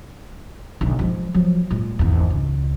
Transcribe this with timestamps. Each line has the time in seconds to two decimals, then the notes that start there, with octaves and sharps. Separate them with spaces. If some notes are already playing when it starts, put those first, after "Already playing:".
0.81 B1 D3
0.99 F3 G#3
1.34 F3 F#3
1.71 A#2 G#3
1.99 G#1 E2
2.30 C#2